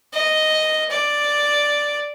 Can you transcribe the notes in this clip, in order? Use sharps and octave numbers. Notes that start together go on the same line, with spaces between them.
D#5
D5